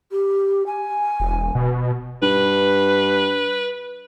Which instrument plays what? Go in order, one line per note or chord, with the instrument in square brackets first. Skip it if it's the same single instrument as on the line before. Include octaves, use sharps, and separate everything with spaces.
[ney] G4
G#5
[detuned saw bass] E1
B2
[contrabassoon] G2 [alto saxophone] B4